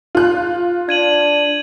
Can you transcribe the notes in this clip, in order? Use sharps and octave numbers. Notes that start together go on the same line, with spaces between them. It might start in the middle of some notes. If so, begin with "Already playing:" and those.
F4 F#6
D4 G#6 D#7 F#7